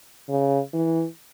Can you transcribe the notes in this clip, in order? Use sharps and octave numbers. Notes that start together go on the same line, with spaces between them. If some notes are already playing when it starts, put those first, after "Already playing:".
C#3
E3